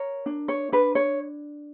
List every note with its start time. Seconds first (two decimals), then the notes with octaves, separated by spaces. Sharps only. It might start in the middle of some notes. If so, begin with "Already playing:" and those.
Already playing: A#4 C#5
0.26 D4
0.48 C#5
0.72 D4 B4
0.95 C#5